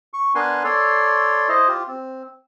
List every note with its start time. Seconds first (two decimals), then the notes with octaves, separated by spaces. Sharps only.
0.13 C#6
0.35 B3 D4 A#4 B4 G#5 C6
0.64 A4 C#5 D5 C6
1.49 E4 C5 D#5
1.68 F4 G4
1.88 C4